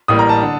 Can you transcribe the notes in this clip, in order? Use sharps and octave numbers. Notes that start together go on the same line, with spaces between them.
A1 A2 G3 A#3 D#6
A#5
A5
D3